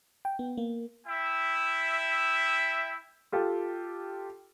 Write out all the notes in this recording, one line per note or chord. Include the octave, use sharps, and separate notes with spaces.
G5
B3
A#3
E4 E5 G5
F4 G4 A4